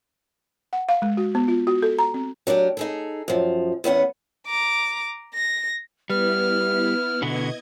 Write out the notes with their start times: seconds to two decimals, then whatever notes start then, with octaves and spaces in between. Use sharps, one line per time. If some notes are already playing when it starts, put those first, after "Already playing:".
0.73 F#5
0.89 F5
1.02 G#3
1.17 F#4
1.35 B3
1.48 F4
1.67 F#4
1.82 A4
1.99 A#5
2.14 C4
2.47 F#3 D4 G4 A#4
2.77 D#4 G#4 A4
3.28 F#2 F3
3.84 E2 B3 C#4 F#5
4.47 A#5 D6
5.34 A#6
6.10 G3 B3 E4 B4 F6
7.22 B2 D3 B3 D#5 G#6